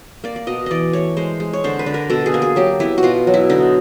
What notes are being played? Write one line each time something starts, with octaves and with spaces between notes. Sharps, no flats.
A#3 D5
D5
B2 D#5
E3 D5 D#5
A3 C#5
G#3 C5
G#3
C#5
D3 C5
B4
D3
A#4
B2 A4
G#4
A#3
G#4
F#3 G4
B3 E4
F#4
B2 F4
F#3
E4
D3 D#4